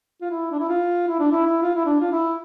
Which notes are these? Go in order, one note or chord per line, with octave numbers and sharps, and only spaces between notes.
F4
E4
D4
E4
F4
E4
D4
E4
E4
F4
E4
D4
F4
E4